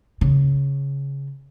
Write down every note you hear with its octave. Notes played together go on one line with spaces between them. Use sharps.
C#3